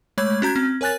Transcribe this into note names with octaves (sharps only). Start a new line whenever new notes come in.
G#3 A3 C#5 B5 G#6
C#4 F#4 A#5 G6 G#6
C4
A#4 C#5 G#5 F#6 A6